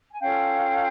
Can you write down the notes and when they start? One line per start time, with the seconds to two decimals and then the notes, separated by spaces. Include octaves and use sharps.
0.12 G#5
0.20 C#4 F4 A4 F5 G5